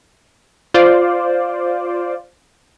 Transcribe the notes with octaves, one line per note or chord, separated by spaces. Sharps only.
F4 C5 D5